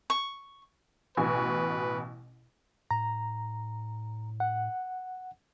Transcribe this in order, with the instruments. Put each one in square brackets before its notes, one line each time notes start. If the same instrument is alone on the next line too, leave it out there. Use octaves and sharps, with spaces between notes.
[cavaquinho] C#6
[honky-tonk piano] A1 B2 G#5 [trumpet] B4
[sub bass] A2 [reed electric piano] A#5
[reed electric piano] F#5